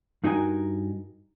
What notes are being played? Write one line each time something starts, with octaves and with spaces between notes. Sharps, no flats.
G2 D#4 F#4 A#4 G#5